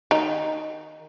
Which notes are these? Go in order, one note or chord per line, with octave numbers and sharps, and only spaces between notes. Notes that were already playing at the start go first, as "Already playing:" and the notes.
D#3 D#4